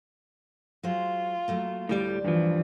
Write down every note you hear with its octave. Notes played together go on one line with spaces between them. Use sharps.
F#3 G#3 F4 C5
F#3 A3 A#3
D2 A2 G3 C5 D5
G2 E3 F3